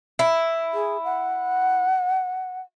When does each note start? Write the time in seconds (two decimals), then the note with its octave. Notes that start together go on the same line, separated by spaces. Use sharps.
0.19 E4
0.74 G#4
1.04 F#5